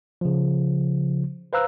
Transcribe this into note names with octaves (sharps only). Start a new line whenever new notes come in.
C#3 F3
B4 C5 F5 A#5 E6 F#6